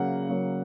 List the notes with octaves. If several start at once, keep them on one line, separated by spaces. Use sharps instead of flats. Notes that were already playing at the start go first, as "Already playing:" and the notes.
Already playing: C#3 F#3 A#3 F#5
C#3 F#3 A#3